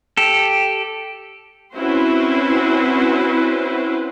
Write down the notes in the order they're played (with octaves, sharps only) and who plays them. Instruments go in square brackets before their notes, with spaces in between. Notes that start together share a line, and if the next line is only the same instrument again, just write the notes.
[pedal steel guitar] G4 A4
[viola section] C4 C#4 E4 F#4 B4 C5